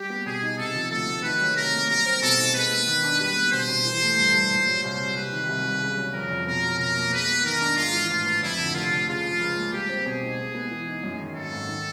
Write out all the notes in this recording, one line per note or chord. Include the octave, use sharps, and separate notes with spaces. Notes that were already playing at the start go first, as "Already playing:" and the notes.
Already playing: G3 G4
B3
B2 G#4
D#4
C3 A4
F3
D2 A4
A3
D#3 B4
F#3
C3 A#4
A#3
G3 A#4
C4
B2 A4
D#4
G#3 B4
B3
D#3
D4
G3 B4
B3
B2 C5
B2
E3
A3
G2
G2
A#2
F#3
C2 C5
C2
C3 B4
D#3
C2
C2
C#3
F#3
F2 A#4
F2
B2 A#4
F#3
B1 A#4
A#3
G#3 B4
B3
D#3 A#4
D4
G#2 F4
E3
A1 F4
A1
F2 E4
D3
F1 F4
F3
C#3 F4
F3
C#2
A#3
G3 G4
C4
B2 G#4
D#4
G#3
B3
E3
D#4
F#2
D#3
G#1 A4
G#1
D#3